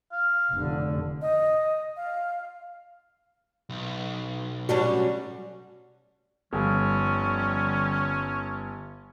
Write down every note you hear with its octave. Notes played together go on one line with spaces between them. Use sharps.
F5
F1 D3
D#5
F5
B1
G3 C#4 D4 F#4
G1 D3 F3 G3 C#4